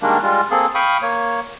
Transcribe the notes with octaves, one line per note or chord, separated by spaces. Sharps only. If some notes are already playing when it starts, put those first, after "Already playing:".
D#3 G3 G#3 A#3 D4
G3 G#3 F4
A#3 C4 G#4 A4
F5 G5 B5 C#6 D#6
A#3 C#5